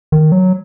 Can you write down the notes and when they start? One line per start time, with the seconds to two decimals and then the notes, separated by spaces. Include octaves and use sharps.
0.12 D#3
0.32 F#3